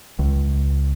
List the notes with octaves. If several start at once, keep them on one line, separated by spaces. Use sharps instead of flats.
C#2